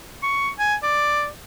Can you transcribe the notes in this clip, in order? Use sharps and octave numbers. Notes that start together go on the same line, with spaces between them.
C#6
G#5
D5